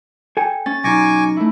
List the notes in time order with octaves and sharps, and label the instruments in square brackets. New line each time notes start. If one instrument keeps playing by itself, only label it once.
[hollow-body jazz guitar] A4 G5 G#5
[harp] C#4 [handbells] A6
[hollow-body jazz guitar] B1 [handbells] D#4 A#6 [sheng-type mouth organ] G#5 C#6 D6
[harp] A3 E4